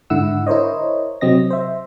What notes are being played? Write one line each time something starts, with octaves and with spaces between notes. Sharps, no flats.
G#2 D3 E4 F#5 E6
E4 A#4 C5 C#5 D#5
C3 F#3 C4 D#5 A#6
C5 E5